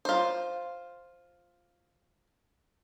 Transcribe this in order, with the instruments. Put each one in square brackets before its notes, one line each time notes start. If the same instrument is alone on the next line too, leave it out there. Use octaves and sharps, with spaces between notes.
[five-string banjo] F4 C5